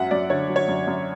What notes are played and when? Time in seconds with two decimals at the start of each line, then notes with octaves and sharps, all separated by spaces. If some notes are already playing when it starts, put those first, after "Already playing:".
Already playing: F#2 F#3 E5 F#5
0.11 F#2 D5
0.30 D3 C#5
0.49 F#3
0.56 C#5
0.68 F#2
0.87 F#2